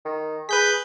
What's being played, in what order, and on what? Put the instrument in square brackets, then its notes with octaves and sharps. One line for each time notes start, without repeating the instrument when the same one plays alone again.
[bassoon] D#3
[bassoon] G#4 [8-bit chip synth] B4 G6 B6